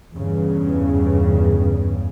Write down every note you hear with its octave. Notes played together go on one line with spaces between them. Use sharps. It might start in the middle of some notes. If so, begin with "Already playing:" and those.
E2 G2 C#3